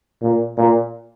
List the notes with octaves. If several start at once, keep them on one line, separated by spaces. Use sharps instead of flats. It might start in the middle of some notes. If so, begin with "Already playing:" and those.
A#2
A#2